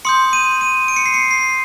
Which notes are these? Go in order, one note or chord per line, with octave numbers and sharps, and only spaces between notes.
C6 D#6 G6 C#7
D#7
D#7
D7
C#7
C7
C#7
C7